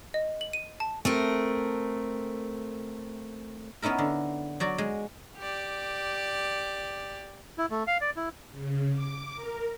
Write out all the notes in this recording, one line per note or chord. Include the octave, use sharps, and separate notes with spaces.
D#5
F#7
D#7
A5
A3 C4 A#4
B3 C#4 D#4 E4 A#4
D3
F#3 F#4 D5
G#3
G4 D5
E4
A3
F5
D5
E4
C#3
D6
A#4